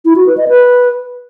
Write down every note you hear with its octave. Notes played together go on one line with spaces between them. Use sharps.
E4
F#4
B4
D#5
B4